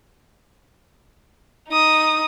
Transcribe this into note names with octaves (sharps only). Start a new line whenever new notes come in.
D#4 D#6